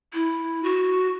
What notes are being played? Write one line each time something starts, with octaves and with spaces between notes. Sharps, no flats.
E4
F#4